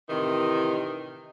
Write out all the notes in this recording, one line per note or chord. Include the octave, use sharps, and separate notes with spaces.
A2 C3 D#3 E3